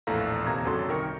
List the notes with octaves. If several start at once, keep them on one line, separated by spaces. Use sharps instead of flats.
A#1 E2 A2 A4 F5 A#5
D#2 C3 A#3 A#5 G#6
G#1 F#2 D3 F#3 A4 C6
C2 D#3 A#4 G5 C#6 C#7